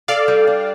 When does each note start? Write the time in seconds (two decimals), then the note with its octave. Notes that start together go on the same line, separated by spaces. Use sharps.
0.08 A4 D5 F5
0.28 G3
0.47 D4